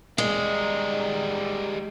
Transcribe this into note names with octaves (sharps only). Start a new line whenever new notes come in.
G3 G#3 D#4